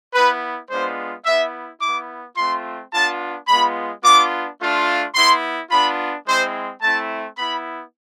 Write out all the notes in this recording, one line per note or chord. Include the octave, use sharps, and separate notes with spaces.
B3 E4 B4
G#3 B3 D4 F4 C5
B3 E4 E5
B3 E4 D6
A3 C4 F4 C6
B3 D4 F4 A5
G#3 B3 F4 B5
B3 D4 F4 D6
A3 D4 F4
B3 E4 C6
B3 D4 F4 B5
G#3 C4 E4 C5
A3 C4 E4 A5
B3 E4 B5